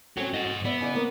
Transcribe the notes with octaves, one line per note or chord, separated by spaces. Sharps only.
C4 C#4 F#4 A4 C#5
F#4 C5 D#5
B3 D5 E5
C#3 D#4 D5
A#3 C4 F#5